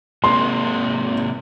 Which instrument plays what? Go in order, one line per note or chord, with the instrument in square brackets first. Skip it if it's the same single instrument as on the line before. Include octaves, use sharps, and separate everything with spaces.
[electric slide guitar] C3 G#3 A#3 [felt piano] C6